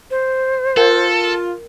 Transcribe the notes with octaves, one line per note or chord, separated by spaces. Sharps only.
C5
F4 A4 A#4